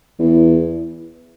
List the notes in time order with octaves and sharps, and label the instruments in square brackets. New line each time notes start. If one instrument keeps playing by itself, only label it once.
[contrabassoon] E2